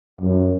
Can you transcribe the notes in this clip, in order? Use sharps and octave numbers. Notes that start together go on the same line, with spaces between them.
F#2